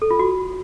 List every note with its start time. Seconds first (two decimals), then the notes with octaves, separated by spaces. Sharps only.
0.02 A4
0.11 F4
0.19 F#4